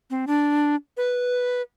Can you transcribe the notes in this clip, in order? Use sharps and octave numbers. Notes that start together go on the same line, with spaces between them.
C4
D4
B4